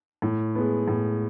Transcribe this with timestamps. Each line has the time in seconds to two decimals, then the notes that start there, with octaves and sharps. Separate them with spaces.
0.22 A2
0.55 G#3 B3
0.88 A2